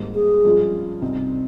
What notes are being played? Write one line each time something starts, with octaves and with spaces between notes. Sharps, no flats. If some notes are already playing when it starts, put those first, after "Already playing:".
Already playing: G#1 G#2 G3 A#3
G#4
G2 F3 G#3 C#4 F4
C2 C3 G3 C4 D#4